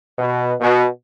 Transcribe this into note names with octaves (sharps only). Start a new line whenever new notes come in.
B2
B2